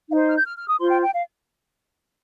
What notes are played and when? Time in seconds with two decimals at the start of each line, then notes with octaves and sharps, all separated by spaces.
0.11 D#4 F5
0.14 C5
0.28 F6
0.36 G6
0.45 F6
0.57 F6
0.67 D#6
0.79 F4 C5 C6
0.91 G5
1.02 G5
1.13 F5